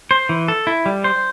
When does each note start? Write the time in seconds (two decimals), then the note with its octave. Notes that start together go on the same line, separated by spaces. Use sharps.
0.11 C5
0.29 E3
0.48 A4
0.67 E4
0.86 G3
1.04 C5